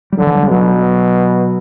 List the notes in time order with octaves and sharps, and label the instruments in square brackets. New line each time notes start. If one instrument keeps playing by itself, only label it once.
[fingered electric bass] G3
[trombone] D3 [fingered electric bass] F#3
[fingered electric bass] E3
F#3
G3
[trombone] B2 [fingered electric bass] F#3